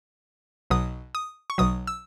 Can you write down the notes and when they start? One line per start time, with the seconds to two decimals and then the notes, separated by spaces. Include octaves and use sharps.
0.70 B1 B2 F#3 D#6
1.15 D#6
1.50 C#6
1.58 B1 B2 F#3 D#6
1.87 E6